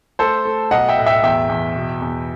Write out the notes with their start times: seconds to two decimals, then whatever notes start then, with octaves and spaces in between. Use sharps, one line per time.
0.19 A3 A4 C5
0.45 A3
0.71 B1 D#5 F#5
0.89 E5 G5
0.97 A2
1.06 E5 G5
1.23 E2 E5 G5
1.49 E2
1.76 B2
2.02 E2